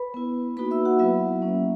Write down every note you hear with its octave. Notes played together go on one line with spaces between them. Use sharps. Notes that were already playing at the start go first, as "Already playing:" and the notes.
Already playing: B4 B5
B3 E4
A#3 D#4 F#4 B4 B5
E5 E6
F#4 F#5
F#3 B3 E4 E5
F#3 A#3 C#4